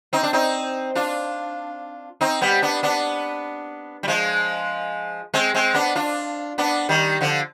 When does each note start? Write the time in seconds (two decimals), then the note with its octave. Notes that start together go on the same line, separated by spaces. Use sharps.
0.13 C4 D#4
0.23 D4
0.33 C4 D#4
0.95 D4 F4
2.21 C4 D#4
2.41 G3 B3
2.62 B3 D4
2.83 B3 D4
4.03 G3
4.08 F3 G#3
5.34 G#3 C4
5.54 G#3 C4
5.74 B3 D4
5.95 D4 F4
6.58 B3 D4
6.89 D#3 G3
7.21 D3 F3